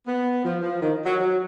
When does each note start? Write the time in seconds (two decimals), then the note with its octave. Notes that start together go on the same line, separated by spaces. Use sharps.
0.07 B3
0.44 F3
0.62 F3
0.81 D#3
1.06 F#3
1.19 F#3